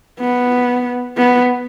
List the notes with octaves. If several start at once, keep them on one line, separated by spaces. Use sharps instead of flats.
B3
B3